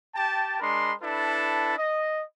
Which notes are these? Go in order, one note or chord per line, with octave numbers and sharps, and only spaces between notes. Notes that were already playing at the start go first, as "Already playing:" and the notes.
G4 G5 A5
G#3 D4 A#4 B5 C6
D4 E4 A4 B4 A5
D#5